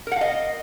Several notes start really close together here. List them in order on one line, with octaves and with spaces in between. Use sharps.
A#4 F#5 F5 D#5